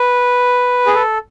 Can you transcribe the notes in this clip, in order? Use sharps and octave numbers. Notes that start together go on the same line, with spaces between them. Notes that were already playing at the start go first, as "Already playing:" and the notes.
Already playing: B4
G#4
A4